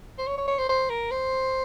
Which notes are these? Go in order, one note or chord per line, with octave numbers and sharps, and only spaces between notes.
C5
C#5
C#5
C#5
C5
C5
A#4
C5